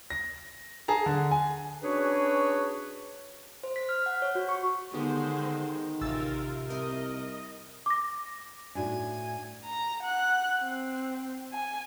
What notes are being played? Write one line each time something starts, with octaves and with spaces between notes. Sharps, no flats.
A#6
G#4 A5 A#5
D3
G#5
C#4 D4 F#4 G#4 B4 C#5
C5
B6
F6
F#5
C#5
F#4
C#6
D3 D#3 G#3 B3 G4 C5
A1 C3 F4 A#4 E6 A6
C2 A#4 D#5
D6 A#6
A2 D4 D#4 F#4 G#5
A#5
F#5 F#6
C4
G#5